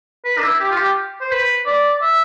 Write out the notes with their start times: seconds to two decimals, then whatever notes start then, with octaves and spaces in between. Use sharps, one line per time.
0.25 B4
0.38 D4
0.43 E4
0.60 G4
0.71 F4
0.78 G4
1.21 C5
1.31 B4
1.66 D5
2.01 E5